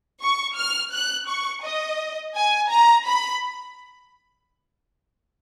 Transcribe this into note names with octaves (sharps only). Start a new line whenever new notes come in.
C#6
F6
F#6
C#6
D#5
G#5
A#5
B5